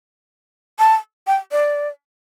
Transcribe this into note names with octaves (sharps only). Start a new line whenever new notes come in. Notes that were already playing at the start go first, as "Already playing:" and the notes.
A5
G5
D5